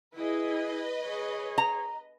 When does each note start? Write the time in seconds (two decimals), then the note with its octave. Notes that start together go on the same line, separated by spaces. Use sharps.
0.15 E4 G#4 B4 D#5
1.05 G#4 C#5
1.58 A#5